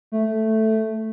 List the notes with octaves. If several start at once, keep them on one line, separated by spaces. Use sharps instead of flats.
A3